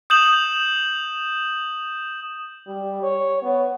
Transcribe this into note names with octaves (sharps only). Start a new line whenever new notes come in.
D#6 G6 E7 F#7
G3
C#5
B3